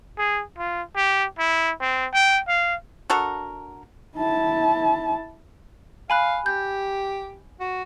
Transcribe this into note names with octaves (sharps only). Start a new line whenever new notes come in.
G#4
F4
G4
E4
C4
G5
F5
D4 F#4 A4 A#4
E4 A5
F5 G#5 B5 F#6
G4 G6
F#4